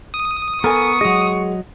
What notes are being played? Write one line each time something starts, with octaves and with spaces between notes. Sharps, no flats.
D#6
B3 A4 A#4 G#5 A#5 C#6
F#3 G#3 D#5 F#5